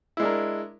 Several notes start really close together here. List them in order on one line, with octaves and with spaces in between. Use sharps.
E4 G#3 D4 A#4